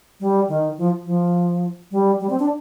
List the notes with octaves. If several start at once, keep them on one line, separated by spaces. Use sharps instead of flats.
G3
D#3
F3
F3
G3
G3
C4
D4